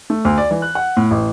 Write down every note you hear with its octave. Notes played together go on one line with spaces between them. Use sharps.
A3
D2
D5
E3
F#6
F#5
A2
A1